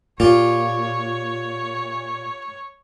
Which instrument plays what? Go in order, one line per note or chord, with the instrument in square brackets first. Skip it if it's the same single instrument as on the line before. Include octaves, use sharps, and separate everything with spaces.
[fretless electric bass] A#2 [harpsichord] F4 G4 [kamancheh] C#5